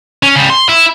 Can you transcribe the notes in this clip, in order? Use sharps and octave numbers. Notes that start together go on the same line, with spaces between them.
C#4
C#3 G3
C6
E4